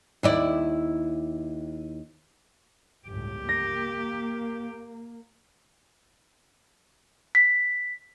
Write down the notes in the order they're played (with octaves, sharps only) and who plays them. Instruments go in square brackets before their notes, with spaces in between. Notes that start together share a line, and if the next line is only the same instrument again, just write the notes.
[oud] D#2 E4 D5
[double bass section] G1 C#2 A2 [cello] G4
[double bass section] A#3 [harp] A#6
[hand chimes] B6